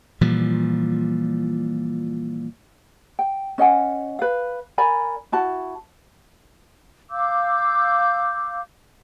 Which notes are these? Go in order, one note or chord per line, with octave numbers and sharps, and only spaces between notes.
A#2 E3 F3 G3
G5
C#4 D#5 F#5 G#5
B4 F5
A#4 D5 G#5 B5
E4 F#4 A5
F5 D6 E6 G6